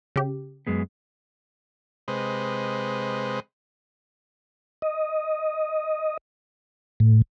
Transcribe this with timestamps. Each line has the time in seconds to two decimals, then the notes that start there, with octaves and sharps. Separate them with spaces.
0.16 C#3 G4
0.67 F#2 G#3 B3
2.08 C3 G#3 B4 C5 D#5
4.82 D#5
7.00 A2